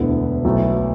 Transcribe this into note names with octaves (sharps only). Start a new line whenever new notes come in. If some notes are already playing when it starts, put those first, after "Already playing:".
Already playing: E1 D2 D3 B3 E4
B1 B2 F#3 A3 E4